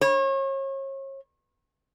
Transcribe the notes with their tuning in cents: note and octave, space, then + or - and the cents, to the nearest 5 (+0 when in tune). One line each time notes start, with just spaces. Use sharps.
C#5 -35